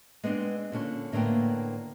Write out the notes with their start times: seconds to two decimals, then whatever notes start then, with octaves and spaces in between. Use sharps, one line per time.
0.24 G#3 B3 C4 D4
0.72 A#2 D3 C#4
1.12 A2 D3 A#3 B3 G5